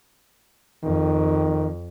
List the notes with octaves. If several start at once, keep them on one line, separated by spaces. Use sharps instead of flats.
F2 D#3